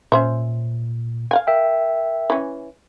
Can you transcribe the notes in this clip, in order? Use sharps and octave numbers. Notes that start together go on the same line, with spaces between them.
A#2 C#4 C5 E5
F5 F#5 G#5
A#4 E5 G5
E3 C#4